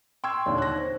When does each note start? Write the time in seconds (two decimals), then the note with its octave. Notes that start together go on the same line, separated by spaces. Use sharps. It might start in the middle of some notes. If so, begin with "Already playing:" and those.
0.24 G5 C6 C#6 E6 G#6
0.46 D#2 A#2 D3 D#4 C#5 D5
0.58 F#6 A#6
0.78 C5